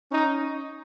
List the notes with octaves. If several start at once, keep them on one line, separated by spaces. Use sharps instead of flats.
C#4 D#4